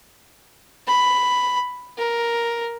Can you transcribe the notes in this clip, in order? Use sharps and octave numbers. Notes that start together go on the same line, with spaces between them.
B5
A#4